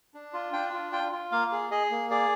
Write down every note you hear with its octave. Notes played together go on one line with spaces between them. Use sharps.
D4
F4
D4 G5
F4
F4 G5
F4
A#3 F5
G#4
G#4 D#5
A#3
G#4 D5